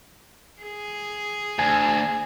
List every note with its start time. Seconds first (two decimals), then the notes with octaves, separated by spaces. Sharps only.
0.62 G#4
1.59 D2 G#5